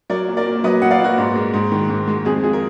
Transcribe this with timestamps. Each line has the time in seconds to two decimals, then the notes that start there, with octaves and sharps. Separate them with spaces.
0.10 F#3 A#4 D5
0.28 A#2
0.37 A#4 D5
0.46 A#2
0.64 F#3 B4 D#5
0.82 F#3 F#5
0.91 D5 F5
1.00 A#2 F#4 A#4
1.18 G#2
1.36 G#3
1.54 G#2
1.72 D#3
1.89 G#2
2.07 G#3
2.25 F2 G#4
2.43 F3 G#4
2.53 A#4